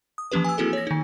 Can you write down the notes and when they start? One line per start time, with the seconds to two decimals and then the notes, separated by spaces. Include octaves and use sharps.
0.18 D#6
0.32 E3 F3 A#3 C#4 G4 B4
0.44 G#5 E6
0.58 A#3 C4 E4 F#4 G#4 A4
0.73 C#5 A#6
0.87 D#3 D#4